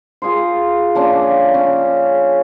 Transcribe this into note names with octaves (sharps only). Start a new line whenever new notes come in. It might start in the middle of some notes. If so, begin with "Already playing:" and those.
F4 G#4 A#4 C5
F3 A#3 C#4 D4
C#4